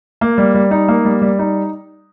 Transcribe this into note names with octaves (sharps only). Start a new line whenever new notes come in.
A#3
G3
G3
D#4
A#3
G3
G3
D#4